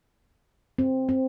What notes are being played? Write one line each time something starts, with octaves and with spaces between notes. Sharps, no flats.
C4
C4